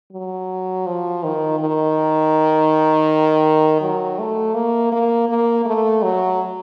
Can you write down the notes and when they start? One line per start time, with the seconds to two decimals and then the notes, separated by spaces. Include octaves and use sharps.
0.12 F#3
0.86 F3
1.23 D#3
1.59 D#3
3.81 F#3
4.19 A3
4.54 A#3
4.92 A#3
5.29 A#3
5.65 A3
6.03 F#3